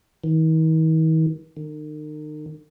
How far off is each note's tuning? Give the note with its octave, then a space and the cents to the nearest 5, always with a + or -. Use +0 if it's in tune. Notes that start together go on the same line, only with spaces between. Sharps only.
D#3 +45
D#3 -40